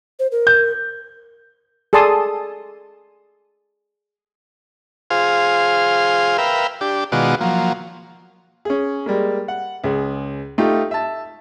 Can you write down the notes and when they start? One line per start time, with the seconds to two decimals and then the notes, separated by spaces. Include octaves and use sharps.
0.19 C5
0.32 A#4
0.47 G6
1.93 G#4 A4 D5 A5 C6 D#6
5.10 F4 G#4 C5 F5
6.38 A#4 B4 E5 F5 G5
6.81 D4 G4
7.12 B2 D#3 G#3 F4 F#4 D5
7.41 F3 F#3 A#3
8.65 C#4 G#4
9.06 G3 G#3 A#3
9.48 F#5
9.84 C#2 G#4
10.58 A3 D#4 F4 G4
10.91 E5 A5